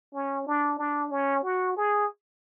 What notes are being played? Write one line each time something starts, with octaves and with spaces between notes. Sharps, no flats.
C#4
D4
D4
C#4
F#4
G#4